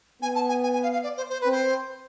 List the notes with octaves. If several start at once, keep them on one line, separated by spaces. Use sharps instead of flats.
B3 G#5
A5
G#5
G#5
G#5
F5
F5
D5
C5
C5
C4 B4
C5